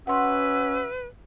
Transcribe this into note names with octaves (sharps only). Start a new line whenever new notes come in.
C#4 F#4 B4 E5 F#5 C6